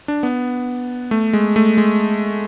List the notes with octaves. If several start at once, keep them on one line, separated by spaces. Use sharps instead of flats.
D4
B3
A3
G#3
A3
G#3